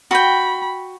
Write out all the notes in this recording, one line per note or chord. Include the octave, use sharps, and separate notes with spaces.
F#4 G5 B5